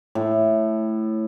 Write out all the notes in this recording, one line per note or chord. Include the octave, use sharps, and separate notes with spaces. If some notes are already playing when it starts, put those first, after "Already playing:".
A2